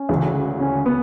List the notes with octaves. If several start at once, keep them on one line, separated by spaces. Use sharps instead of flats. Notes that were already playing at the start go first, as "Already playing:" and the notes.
Already playing: C#4
D2 C#3 E3
C#4
B3